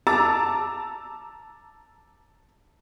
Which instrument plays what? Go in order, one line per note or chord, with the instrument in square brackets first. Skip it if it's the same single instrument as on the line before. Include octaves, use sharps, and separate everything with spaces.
[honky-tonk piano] A5 A#5 D6 E6 A6